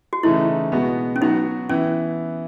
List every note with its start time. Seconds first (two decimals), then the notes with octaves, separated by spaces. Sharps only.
0.13 F#4
0.23 C#3 E3 A3 D#4 E4
0.72 B2 G#3 B3 F#4
1.16 C#4
1.21 F#3 B3 D#4 F#4
1.69 E3 B3 C#4 E4